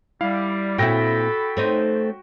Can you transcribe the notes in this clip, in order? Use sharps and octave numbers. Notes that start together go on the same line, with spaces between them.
G3 E4 F5
A#2 C4 E4 F#4 A4 G5 B5 A#6
A3 C4 D#4